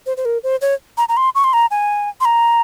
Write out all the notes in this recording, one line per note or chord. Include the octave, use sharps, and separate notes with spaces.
C5
C5
A#4
C5
C#5
A#5
A#5
C6
C#6
C6
A#5
G#5
C6
A#5